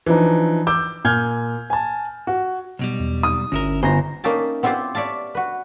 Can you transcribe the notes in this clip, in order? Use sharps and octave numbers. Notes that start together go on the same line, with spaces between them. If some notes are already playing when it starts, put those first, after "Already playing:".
E3 F3 D4 D#4
D6 E6 G6
A#2 G#5 F6 G6 G#6
G#5 A5
F#4
B1 B2 G3
E2
D#6
G1 D2 C#4 E4 A#4
G1 C5 G#5 A#5 A#6
A#3 C#4 D#4 E5 G5 A5
B3 C4 E4 F4 G4 C5
C#5 D5 E5 F5 A5
F#4 B4